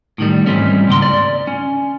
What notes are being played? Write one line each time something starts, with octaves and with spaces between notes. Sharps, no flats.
A2 D#3 G3
G#2 E3 G3 C4 C#4
C#2 G#2 A#3 C6
D5
C#4